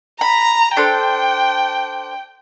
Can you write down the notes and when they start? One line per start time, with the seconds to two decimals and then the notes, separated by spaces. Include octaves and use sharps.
0.21 A#5 B5
0.77 D4 A4 C5 G5